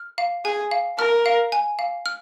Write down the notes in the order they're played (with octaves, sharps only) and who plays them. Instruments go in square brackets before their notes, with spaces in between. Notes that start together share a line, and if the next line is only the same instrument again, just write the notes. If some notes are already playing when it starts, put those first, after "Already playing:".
Already playing: [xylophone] F6
F5
[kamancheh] G#4 [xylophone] G#5
[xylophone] F5
[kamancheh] A#4 [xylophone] F6
[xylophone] F5
G#5
F5
F6